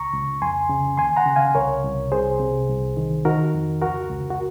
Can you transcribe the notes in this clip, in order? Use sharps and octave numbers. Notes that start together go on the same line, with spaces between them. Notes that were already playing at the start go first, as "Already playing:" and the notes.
Already playing: C#2 A#5 C#6
C#2
F2 G#5 C6
C#3
D#2 G#5 C6
F#5 A#5
C#3
F5 G#5
C2 A#4 C#5
C2
C2 G#4 C5
C3
C2
D#3
D#3 F#4 A#4
F2
C#2 F#4 A#4
C#2
F#4